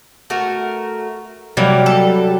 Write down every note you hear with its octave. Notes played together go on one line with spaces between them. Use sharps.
A3 F#4 A#4
C3 F#3 G3 A#3 E4
A4